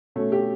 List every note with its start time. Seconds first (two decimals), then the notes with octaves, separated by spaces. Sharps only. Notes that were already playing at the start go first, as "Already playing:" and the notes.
0.16 B2 A3 C#4 A4
0.32 G4